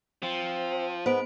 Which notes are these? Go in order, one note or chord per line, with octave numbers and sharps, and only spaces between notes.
F3 C4
G#2 B3 C5 D7